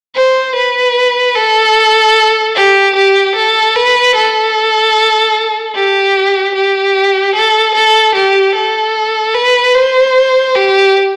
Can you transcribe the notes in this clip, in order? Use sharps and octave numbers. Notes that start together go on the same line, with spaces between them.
C5
B4
A4
G4
G4
A4
B4
A4
G4
G4
A4
A4
G4
A4
B4
C5
G4